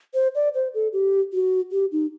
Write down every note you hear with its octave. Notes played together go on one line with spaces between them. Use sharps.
C5
D5
C5
A4
G4
F#4
G4
D#4